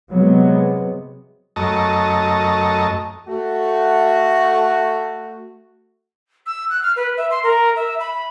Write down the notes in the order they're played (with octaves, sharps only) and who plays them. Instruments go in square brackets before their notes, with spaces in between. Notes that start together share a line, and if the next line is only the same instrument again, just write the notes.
[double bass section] C3 F#3 G#3 B3
[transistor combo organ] F#2 A3 D#5 A5 A#5 C#6
[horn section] A3 F#4
[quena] E6
F#6
F6
B4
E5
C6
A#4
E5
B5